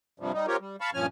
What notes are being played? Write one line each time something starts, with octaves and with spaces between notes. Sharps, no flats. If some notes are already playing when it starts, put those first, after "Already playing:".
G2 C3 F3 G3
G3 D#4
C4 F4 G4 A#4 C#5
G3
F5 A5 B5 C#6
G2 A#2 F3 C#4 G#5 F6